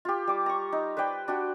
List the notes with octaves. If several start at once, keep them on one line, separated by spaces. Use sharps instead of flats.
F4 G4
G3 D6
A#5 C#6
D#4
B4 C5 D5 G5
D4 F#4 G5